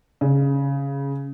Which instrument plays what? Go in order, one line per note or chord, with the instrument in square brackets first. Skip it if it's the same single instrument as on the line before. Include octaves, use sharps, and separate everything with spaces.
[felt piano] C#3